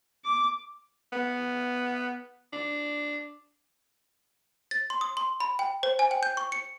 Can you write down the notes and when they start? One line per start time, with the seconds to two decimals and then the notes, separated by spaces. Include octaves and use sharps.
0.24 D6
1.13 B3
2.53 D4
4.71 A6
4.90 C6
5.01 D#6
5.17 C6
5.40 B5
5.59 G5
5.83 C5
5.99 G#5
6.11 G5
6.23 G6
6.37 C#6
6.52 C#7